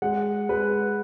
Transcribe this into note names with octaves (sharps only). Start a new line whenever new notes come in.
G#3 F#5
G#3 B4